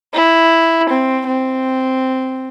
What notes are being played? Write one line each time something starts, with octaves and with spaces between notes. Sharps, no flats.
E4
C4
C4